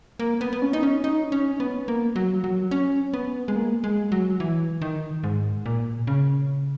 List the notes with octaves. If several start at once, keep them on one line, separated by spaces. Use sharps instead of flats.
A#3
B3
B3
C#4
D#4
C#4
D#4
C#4
B3
A#3
F#3
F#3
C#4
B3
G#3
A#3
G#3
F#3
E3
D#3
G#2
A#2
C#3